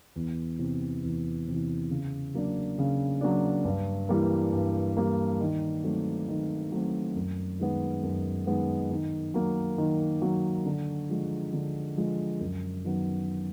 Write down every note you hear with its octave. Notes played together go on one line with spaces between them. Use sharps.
E2
C3 E3
E2
C3 E3
C#3
F#3 A#3 D4
C#3
F#3 A#3 D4
G2
E3 G3 A#3
G2
E3 G3 A#3
D#3
F#3 A3 C4
D#3
F#3 A3 C4
F#2
D#3 G#3 B3
F#2
D#3 G#3 B3
D#3
F#3 A#3
D#3
F#3 A#3
D3
F3 G#3
D3
F3 G#3
F#2
D#3 F#3 B3